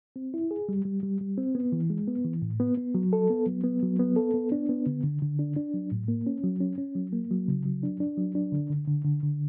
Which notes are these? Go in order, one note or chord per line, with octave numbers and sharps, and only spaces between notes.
C4
E4
G#4
G3
G3
G3
G3
C4
B3
E3
G#3
B3
E3
A2
B3
B3
F#3
A4
B3
F#3
B3
F#3
B3
A4
B3
D4
B3
D3
D3
D3
D4
D4
F#3
A2
A#3
C#4
F#3
C#4
C#4
F#3
A#3
F#3
C#3
F#3
D4
D4
F#3
D4
D3
D3
D3
D3
D3